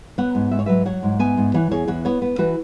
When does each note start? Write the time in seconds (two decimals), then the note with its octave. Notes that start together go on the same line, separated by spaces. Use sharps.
0.18 B3 C#5 F#5
0.35 G#2
0.51 G#2 E5
0.59 C#5
0.66 F#3 B4 E5
0.86 F#3 C#5 F#5
1.03 G#2
1.19 B3 E5 G#5
1.37 G#2
1.54 E3 C#5 F#5
1.71 E2 G#4 C#5
1.88 E2 C#5 F#5
2.05 B3 C#5 F#5
2.22 B3
2.38 E3 F#4 B4